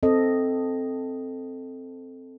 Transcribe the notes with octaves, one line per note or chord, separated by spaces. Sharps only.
C4 A4 D#5